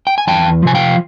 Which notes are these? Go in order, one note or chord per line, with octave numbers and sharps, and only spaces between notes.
G5
G#5
E2 G5 A5
C3 F3 G#5
F5 G5